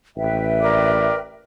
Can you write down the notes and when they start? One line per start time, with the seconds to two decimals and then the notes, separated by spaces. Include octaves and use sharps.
0.17 A1 B4 E5 G5
0.62 A#4 D5